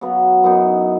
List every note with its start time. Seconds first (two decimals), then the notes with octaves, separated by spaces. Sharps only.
0.01 C#3 F#3 B3
0.44 F#2 E3 B3 D#4